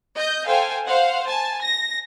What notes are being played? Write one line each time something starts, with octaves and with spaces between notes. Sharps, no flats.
D#5 G6
A4 C5 F5 G5 G#5
C5 F5 F#5
G#5 A5
A#6